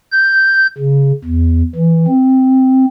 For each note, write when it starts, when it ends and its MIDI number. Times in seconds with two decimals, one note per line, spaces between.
0.12 0.67 91
0.78 1.12 49
1.25 1.62 40
1.75 2.06 52
2.08 2.86 60